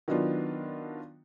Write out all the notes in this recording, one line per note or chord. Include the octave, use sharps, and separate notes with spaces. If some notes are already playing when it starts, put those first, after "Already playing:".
D#3 F#3 B3 D4 F4